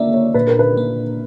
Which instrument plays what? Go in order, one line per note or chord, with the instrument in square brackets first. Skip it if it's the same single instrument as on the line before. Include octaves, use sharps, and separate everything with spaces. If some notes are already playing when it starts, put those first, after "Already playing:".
Already playing: [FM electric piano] A#3 D4 [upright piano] D5 E5
[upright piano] C#5
[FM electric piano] A#2 [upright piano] B4
[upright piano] A#4
B4
[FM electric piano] A#3